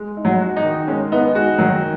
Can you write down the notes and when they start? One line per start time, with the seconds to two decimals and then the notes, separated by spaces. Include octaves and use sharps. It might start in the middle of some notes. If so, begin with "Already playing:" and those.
Already playing: G#3
0.17 D#4
0.25 F#3
0.40 F#4
0.57 D#4
0.64 D#3
0.87 G#3 C#4
1.12 B3 D#4
1.35 G#3 F#4
1.58 D#3 F#3